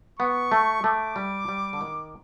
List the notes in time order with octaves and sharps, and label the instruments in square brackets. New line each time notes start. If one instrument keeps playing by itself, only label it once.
[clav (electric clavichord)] B3 [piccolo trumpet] C#6
[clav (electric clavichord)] A3
[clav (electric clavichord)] A3 [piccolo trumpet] D6
[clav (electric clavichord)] G3
G3
D3
D#3